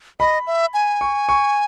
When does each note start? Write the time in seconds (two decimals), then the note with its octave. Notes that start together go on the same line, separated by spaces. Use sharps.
0.20 D#5 B5
0.47 E5
0.74 G#5
1.01 C#6
1.29 C#6